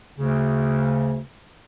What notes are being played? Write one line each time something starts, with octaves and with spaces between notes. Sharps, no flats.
D2 C#3